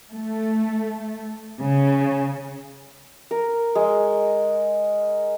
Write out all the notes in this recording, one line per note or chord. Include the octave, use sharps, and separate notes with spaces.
A3
C#3
A#4
G#3